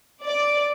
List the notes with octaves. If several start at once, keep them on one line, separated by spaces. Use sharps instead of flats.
D5